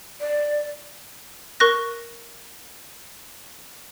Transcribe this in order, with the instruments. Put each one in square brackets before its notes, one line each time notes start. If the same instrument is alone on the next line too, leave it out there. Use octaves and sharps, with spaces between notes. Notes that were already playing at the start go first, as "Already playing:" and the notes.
[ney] D5
[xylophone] A#4 C#6 F#6 A#6